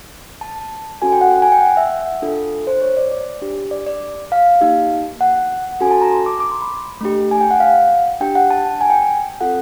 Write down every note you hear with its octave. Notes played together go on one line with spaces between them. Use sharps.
A5
C#4 F#4 A4 G#5
G5
F#5
G#5
G5
F#5
E5
D4 F4 A4
C5
C#5
D5
D5
D4 G4
D5
D5
F5
A#3 D#4 G4
F#5
C#4 F#4 A4 G#5
A5
A#5
C6
D6
D6
C6
B5
A3 D4 G4
G#5
G5
F#5
F5
D4 G4 G5
F#5
A5
G#5
G5
C4 F4 A4 F#5